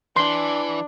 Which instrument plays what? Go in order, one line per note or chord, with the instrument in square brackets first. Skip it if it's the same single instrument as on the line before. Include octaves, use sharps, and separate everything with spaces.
[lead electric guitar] E3 [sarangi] D4 [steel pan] C6